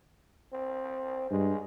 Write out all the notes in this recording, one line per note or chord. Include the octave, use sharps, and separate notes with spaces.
C4
G2 G#3